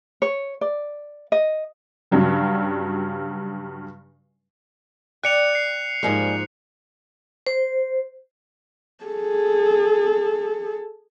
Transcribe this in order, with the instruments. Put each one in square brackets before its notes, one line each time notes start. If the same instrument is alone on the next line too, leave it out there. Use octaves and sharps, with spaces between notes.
[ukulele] C#5
D5
D#5
[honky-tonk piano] G2 C#3 F#3 G3
[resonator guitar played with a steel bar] D5 G5 [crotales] F#6 C#7 F7
[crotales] C7
[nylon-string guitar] G#2 F3 A#3 [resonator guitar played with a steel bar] G3 G#3
[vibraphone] C5
[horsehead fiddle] G#4 A4